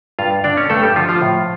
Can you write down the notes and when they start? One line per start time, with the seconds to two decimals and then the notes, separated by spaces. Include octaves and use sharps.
0.19 G2 F4 F5
0.44 D3 D4 D5
0.57 C#4 C#5
0.70 G2 A3 A4
0.83 G3 G4
0.96 D3 F3 F4
1.09 F3 F4
1.22 A2